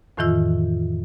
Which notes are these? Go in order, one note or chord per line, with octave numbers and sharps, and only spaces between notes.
F2 A2 D#3 E3 F4 E6